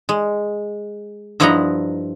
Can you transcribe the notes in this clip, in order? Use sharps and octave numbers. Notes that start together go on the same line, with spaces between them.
G#3
G2 F3 E4 D#5 F#5 A#5